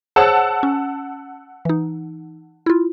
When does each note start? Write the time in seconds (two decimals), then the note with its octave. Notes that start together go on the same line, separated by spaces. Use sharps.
0.16 G#4 C5 C#5 F#5 A5 E6
0.63 C#4
1.65 E3 D#4
2.66 E4 F4